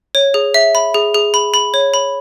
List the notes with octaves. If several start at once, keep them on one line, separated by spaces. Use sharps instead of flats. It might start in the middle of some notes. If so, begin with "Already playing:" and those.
C#5
G#4
E5
B5
G#4
G#4
B5
B5
C#5
B5